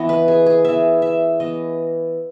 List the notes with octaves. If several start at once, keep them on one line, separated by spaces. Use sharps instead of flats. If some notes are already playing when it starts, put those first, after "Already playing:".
Already playing: E3 B3 D#5
B4
G#4
G#4
E3 B3 E5
E5
E3 B3 D#5